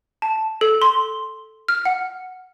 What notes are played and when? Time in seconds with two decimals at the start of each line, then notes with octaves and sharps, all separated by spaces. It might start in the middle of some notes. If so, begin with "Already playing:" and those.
0.22 A5
0.61 A4
0.82 C6
1.68 F6
1.85 F#5